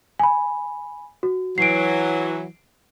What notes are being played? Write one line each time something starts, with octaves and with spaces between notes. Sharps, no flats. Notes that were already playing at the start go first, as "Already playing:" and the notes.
G#5 B5
F#4
E3 F#3 C7 D7